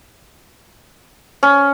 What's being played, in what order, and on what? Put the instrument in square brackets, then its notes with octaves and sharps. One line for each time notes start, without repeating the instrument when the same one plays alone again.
[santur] C#4